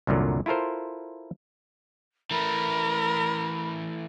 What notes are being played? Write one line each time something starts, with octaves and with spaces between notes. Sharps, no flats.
C2 F#2 A#2 D3 F#3
E4 F4 A4 A#4 C5
E3 A3 A#4 B5